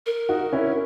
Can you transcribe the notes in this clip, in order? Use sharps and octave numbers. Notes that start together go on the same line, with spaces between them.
A#4
D#4 F#4
C#4 E4